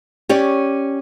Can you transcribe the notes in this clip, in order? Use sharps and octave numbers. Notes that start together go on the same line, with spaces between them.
C#4 G4 C#5 D5